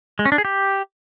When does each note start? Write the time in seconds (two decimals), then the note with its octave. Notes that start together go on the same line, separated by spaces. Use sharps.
0.19 G#3
0.25 C#4
0.32 D4
0.38 G#4
0.45 G4